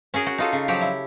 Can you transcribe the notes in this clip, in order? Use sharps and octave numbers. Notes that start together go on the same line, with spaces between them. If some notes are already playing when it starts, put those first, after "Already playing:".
C#4 F#4 G#4 A#4
F#4
D#4 F4 A4
C#3
F3 F#3 G4
E4